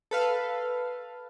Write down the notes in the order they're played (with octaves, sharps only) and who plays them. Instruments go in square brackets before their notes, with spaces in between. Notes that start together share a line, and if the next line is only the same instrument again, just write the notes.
[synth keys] A4 B4 F5